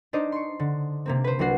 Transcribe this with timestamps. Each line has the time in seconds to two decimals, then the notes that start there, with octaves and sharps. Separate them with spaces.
0.13 D4 D#4 C5 D5 D#5
0.32 C6 C#6
0.59 D3
1.06 C3 A#3 C4
1.24 B4 C5
1.39 C2 F#3 D4 F#4 C7